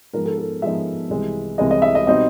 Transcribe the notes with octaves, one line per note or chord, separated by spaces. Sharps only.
G#2 F3 G#3 B3 D#4 A#4
A4
A4
G#2 F3 G#3 B3 D#4 E5
C2 C3 E3 G#3
C2 C3 E3 G#3 D#5
D#5
E5
D#5
B2 G3 C4 D#4 D#5